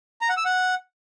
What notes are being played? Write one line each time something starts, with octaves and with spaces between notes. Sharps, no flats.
A#5
F#5
E6
F#5